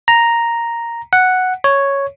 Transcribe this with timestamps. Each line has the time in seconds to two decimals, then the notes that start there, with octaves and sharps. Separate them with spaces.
0.08 A#5
1.13 F#5
1.64 C#5